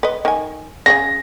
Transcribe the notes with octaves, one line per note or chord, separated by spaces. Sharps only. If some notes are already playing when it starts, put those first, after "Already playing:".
B4 D#5
D#3 G#5
C#3 F#4 G#4 A#6